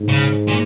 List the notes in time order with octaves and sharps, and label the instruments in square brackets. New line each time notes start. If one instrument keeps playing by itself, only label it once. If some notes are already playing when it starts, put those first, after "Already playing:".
Already playing: [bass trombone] G#2
[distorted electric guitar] C#3
A#2